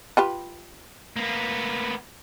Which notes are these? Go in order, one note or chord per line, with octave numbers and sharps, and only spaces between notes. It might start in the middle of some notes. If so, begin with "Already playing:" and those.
F4 G4 B4
A#3 B3